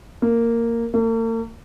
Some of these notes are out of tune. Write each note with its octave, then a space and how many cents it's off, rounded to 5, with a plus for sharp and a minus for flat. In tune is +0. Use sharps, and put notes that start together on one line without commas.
A#3 -10
A#3 -45